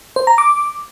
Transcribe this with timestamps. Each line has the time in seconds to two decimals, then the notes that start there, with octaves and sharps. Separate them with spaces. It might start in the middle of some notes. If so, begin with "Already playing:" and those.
0.16 C5
0.27 A#5
0.38 D6